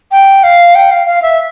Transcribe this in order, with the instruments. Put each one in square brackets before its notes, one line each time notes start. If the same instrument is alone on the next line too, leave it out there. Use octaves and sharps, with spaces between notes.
[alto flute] G5
F5
G5
F5
F5
E5